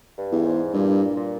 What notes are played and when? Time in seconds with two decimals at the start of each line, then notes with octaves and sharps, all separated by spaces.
0.18 G2
0.32 E2
0.45 G#2
0.73 G2 A#2
1.16 A#2